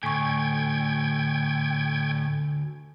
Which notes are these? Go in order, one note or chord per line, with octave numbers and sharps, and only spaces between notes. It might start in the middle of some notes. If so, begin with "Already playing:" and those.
D2 A2 G5 G#5 C#6 G#6